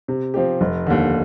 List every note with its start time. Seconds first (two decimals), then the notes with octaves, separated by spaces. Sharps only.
0.08 C3
0.34 F3 C4 G4
0.61 F1
0.87 D#2 D3